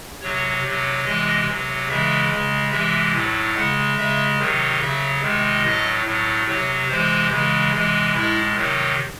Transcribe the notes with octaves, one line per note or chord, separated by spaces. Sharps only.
C3 F#3 C#5
C3 F#3
C3 E3 G#3 D#5
C3 F#3
C#3 E3 G#3 E5
C#3 G#3
C3 E3 G#3 E5
A2 F#3
C#3 G#3 F#5
C#3 G#3 E5
C3 D#3 F#3
C#3 F#3 E5
C3 D#3 G#3
A2 F#3 D#5
A2 F#3
C3 F#3 C#5
C3 E3 G#3 C5
C#3 E3 G#3
C3 E3 G#3
A2 G#3 E4
C3 D#3 F#3